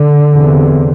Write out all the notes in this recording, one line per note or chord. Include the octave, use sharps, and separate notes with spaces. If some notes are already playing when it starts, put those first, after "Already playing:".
Already playing: D3
E2 C3